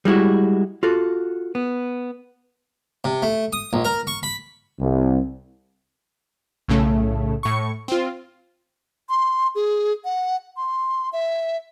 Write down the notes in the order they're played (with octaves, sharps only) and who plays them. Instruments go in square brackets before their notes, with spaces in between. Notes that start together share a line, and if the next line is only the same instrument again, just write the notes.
[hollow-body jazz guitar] G3 G#3 E4 F#4
F4 F#4 A4
B3
[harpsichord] C3
A3
D#6
A#1
A#4
C#6
B5
[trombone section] C2
[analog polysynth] B1 A2 C#3 A3
A2 C#6
C4 F4
[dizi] C6
G#4
F#5
C6
E5